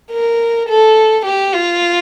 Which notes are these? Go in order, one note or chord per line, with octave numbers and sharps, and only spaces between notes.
A#4
A4
G4
F4